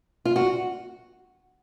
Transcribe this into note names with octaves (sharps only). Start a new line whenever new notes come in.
F4
F#4